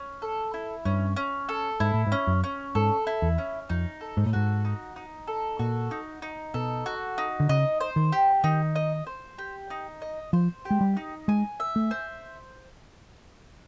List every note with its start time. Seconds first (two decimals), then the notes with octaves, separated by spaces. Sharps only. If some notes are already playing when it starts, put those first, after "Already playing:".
Already playing: C#4
0.22 A4
0.54 E4
0.85 G2 C#4
1.16 C#4
1.49 A4
1.80 G#2 E4
1.94 A2
2.07 G#2
2.12 C#4
2.27 F#2
2.44 C#4
2.75 G#2 A4
3.07 E4
3.22 E2
3.38 C#4
3.70 F2 D#4
4.01 A4
4.17 G#2
4.26 A2
4.33 G#2 F#4
4.65 D#4
4.96 D#4
5.28 A4
5.59 A#2 F#4
5.91 D#4
6.22 D#4
6.54 B2 A4
6.86 F#4
7.18 D#4
7.40 D3
7.49 C#3 D#5
7.80 C5
7.96 D#3
8.12 G4
8.44 D#3 D#4
8.76 D#5
9.07 C5
9.38 G4
9.70 D#4
10.02 D#5
10.33 F3 C5
10.65 G4
10.71 G#3
10.81 G3
10.97 D#4
11.28 G#3 G#5
11.60 E5
11.76 A3
11.91 C5